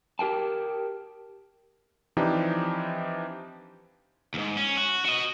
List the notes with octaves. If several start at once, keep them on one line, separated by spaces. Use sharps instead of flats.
G4 A#4 G5 A5
E3 F3 C4 D4 D#4 G4
D#2 G#2
C#4
F#4
F#4 D#5